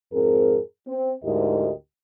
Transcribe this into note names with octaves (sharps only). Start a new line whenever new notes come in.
F2 G#2 C4 G#4 A#4
C4
D2 G#2 E4 G4 A#4 D#5